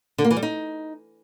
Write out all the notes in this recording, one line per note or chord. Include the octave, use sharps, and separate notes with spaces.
D3
A#3
E3
G3
D#4